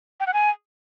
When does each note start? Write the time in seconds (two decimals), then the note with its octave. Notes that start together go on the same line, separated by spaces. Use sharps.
0.20 G5
0.27 F#5
0.34 G#5